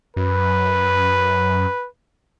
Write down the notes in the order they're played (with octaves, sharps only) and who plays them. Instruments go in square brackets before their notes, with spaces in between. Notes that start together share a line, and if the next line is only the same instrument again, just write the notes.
[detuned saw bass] F#2 [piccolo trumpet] B4